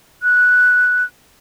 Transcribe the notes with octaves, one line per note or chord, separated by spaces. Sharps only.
F#6